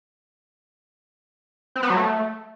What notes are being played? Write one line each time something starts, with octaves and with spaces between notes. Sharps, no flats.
C4
B3
F#3
A3